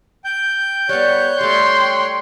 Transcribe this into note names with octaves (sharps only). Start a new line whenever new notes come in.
G5 G6
G3 B3 C#5 F#6
G3 A3 G5 C6